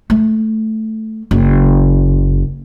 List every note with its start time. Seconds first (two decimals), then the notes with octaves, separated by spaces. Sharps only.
0.10 A3
1.31 F#1